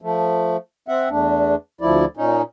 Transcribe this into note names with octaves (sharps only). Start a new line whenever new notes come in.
F3 A3
C4 E5 F#5
E2 A3 D4
D2 F3 E4 D5
A#2 C#4 D#4